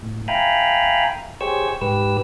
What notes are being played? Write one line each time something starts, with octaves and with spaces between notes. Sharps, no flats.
A2
E5 F5 G5 G#5 A#5 B5
G4 G#4 C5 C#5 C#6 E6
G#2 G4 B4 E6